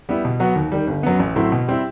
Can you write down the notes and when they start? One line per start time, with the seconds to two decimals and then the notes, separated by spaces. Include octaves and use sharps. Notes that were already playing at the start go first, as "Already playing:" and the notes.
0.09 G3 B3 E4
0.25 B2
0.40 F#3 B3 F#4
0.55 D#2
0.72 D#3 G3
0.87 G1
1.03 F#2 F#3 B3
1.20 A1
1.36 A2 F#3 C4 E4
1.52 B2
1.68 G3 C4 E4